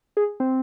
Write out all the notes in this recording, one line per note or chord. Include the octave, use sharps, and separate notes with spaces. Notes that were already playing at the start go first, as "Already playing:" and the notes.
G#4
C4